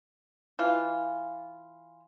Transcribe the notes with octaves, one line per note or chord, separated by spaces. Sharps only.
E3 F4